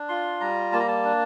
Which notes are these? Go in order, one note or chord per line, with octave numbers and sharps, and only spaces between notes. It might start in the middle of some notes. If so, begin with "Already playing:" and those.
Already playing: D4
F4 C6
G3 A#5
A#3 A5
A#5
A5
D4